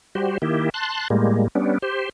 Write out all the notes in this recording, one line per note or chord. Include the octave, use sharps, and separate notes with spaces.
G3 F#4 G4 C5
D#3 A#3 E4 G4
A5 C6 F#6
A2 G3 G#3 A#3
G3 B3 C#4 D4
G4 C5